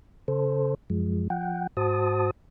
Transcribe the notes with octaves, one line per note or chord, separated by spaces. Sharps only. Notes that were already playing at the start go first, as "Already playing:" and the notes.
C#3 A4 C5
F#2 F3 G#3
F3 F#5 G5
G#2 F#4 C5 A5 D#6